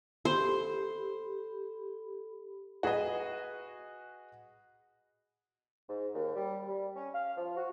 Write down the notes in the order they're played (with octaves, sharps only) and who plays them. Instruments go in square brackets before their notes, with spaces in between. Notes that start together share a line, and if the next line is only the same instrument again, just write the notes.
[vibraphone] G4 A4 B5 [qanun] C5
[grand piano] F#4 G#4 B4 D#5
[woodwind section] G#2
D#2
G3
G3
C#4
F5
F3
F#4